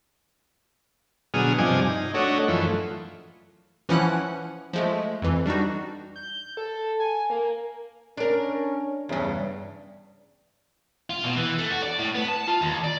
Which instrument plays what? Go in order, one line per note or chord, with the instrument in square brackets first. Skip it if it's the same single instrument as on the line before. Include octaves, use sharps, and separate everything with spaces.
[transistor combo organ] B2 D3 F#3 G#4 D#6 F6
G2 C3 F3 D5 D#5 G#5
D#4
A3 D4 F#4 C#5 D#5
F#2 E3 F3 A3
[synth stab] E3 F3 C#4 E4 F#5 F#6
F3 G#3 A3
F2 E3
G3 D4 D#4 F#4
[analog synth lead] G6
A4
G#5
A#3
[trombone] C#4 [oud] D4 A#4
[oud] E2 G2 [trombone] C#3
[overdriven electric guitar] F4
B2
E3
A3
F#4
D5
A2
B3
A5
F4
D#2
D5